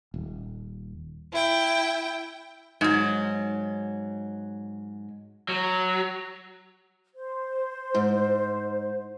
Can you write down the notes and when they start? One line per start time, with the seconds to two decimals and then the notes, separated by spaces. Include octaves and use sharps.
0.14 D#1
1.33 E4 G5
2.81 G#2 F#3
5.49 F#3
7.16 C5
7.95 G#2